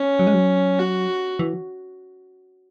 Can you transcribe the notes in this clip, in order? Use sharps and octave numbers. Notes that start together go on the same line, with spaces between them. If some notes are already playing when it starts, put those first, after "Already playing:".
Already playing: C#4
F#3
G#3
F#3
F#4
E3